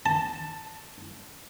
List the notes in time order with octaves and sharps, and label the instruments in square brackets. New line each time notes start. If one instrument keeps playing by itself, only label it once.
[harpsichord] A5